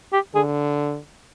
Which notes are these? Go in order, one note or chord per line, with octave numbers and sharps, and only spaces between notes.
G4
D3 G#4